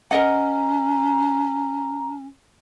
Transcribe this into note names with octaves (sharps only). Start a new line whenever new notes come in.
C#4 A#4 D#5 F#5 A#5